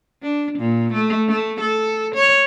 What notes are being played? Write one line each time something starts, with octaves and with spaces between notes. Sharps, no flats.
D4
A#2
A3
A3
A4
C#5